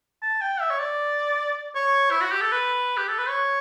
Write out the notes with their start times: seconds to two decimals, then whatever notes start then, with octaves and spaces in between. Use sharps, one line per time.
0.22 A5
0.41 G5
0.60 E5
0.70 C#5
0.79 D5
1.75 C#5
2.11 E4
2.21 F#4
2.32 G4
2.41 A4
2.52 B4
2.97 G4
3.08 A4
3.18 B4
3.29 C#5